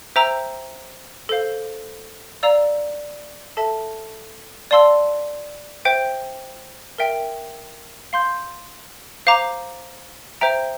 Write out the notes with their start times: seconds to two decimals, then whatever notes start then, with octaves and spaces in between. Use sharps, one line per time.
0.16 C5 E5 G5 A#5 E6
1.29 A4 C5 F5
2.43 D5 F5 A#5 E6
3.57 A4 E5 A5
4.71 D5 F5 A5 C6 E6
5.85 C5 E5 G5
6.98 A#4 E5 G5
8.13 F5 C6 G6
9.27 C5 F5 A#5 D6
10.41 C5 E5 G5 A#5